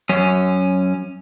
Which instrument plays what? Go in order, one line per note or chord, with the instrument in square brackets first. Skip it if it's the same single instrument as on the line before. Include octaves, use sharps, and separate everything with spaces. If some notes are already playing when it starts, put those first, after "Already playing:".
[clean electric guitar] F#2 C#4